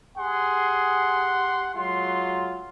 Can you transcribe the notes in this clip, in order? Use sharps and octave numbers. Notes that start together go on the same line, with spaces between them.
G4 G#4 F#5 C6
F#3 G#3 F4 C6